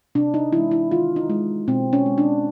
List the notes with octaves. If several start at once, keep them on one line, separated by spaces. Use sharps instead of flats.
C3 D4
D#4
E3 G#3 E4
E4
D#3 F4
D#4
G#3
B2 C4
C#4
G#3
D4